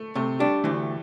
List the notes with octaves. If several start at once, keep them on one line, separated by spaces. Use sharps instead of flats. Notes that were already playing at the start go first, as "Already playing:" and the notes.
Already playing: A3
C3 A3
G3 D4
D2 E3